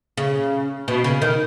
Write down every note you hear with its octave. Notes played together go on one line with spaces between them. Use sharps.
C#3
B2
C#3
D#3